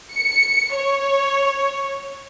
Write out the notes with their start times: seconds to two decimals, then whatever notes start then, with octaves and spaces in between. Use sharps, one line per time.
0.13 C#7
0.75 C#5